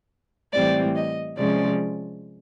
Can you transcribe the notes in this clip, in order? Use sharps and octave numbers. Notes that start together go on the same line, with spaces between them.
A2 E3 G3 C4 D5
D#5
C3 F3 G#3 C#4 D5